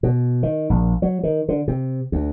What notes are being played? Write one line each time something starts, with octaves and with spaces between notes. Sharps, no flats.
B2
D#3
A#1
F#3
D#3
D3
C3
D2